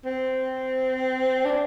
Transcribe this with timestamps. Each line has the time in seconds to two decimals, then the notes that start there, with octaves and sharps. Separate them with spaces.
0.05 C4
1.45 D4